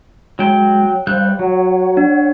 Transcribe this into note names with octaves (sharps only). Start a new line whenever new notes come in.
F#3 G#3 G5
G3 C5 F5 F#6 G6
F#3 C#5 F#5
D4